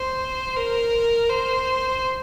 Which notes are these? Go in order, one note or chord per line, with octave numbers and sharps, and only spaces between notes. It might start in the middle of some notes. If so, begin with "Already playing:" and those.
Already playing: C5
A#4
C5